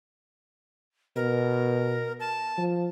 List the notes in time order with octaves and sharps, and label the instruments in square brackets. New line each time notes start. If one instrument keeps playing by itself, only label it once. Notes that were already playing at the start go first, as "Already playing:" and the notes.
[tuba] B2 [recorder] A#4
[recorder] A5
[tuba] F3